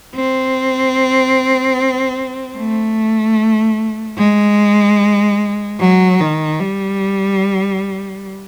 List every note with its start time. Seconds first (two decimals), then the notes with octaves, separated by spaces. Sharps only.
0.15 C4
2.57 A3
4.18 G#3
5.79 F#3
6.20 D#3
6.59 G3